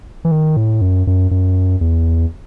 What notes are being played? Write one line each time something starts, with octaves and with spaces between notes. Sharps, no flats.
E3
D#3
A2
F#2
F#2
F#2
E2